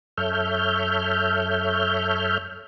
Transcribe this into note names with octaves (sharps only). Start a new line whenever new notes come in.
F#2 A4 C#5 E5 F6 G6